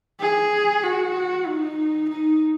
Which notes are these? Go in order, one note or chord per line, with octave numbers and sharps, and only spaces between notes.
G#4
F#4
D#4
D#4